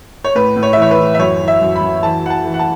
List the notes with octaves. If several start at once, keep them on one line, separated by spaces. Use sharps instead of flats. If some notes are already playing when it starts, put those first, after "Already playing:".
C#5
A2 B4
A2
C#5
E5
E3 C#5
B4
E3
E5
F#2 C#5
E3
E5
F#2
B5
F#2
E3 A5
E3 F#5
A5
E3
F#5
A5